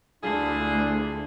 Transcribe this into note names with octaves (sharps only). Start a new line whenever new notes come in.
D2 D4 E4 F4 G#4